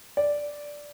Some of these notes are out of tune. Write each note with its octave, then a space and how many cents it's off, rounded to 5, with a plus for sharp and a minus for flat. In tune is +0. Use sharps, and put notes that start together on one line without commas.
D5 -5